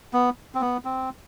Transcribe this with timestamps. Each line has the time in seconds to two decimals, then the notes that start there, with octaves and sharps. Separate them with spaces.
0.13 B3
0.55 C4
0.61 B3
0.85 C4